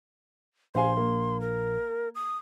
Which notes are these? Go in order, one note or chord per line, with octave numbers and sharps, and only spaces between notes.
A#1 C5 F5 G#5 C6
A#3
A#4
D#6